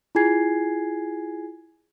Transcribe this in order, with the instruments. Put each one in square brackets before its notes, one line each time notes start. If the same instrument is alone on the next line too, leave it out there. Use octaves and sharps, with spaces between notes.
[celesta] E4 F4 G#4 G#5 G#6 C7